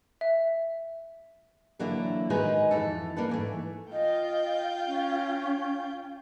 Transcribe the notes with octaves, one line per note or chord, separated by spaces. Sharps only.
E5
D3 E3 F#3 A#3 D4 E4
D#3 G#3 D#4 F#4 G#4 B4
F2 E3 A4
A#3 D4 A4 B4
G#2 E3 A3
F4 D#5 G5
C#4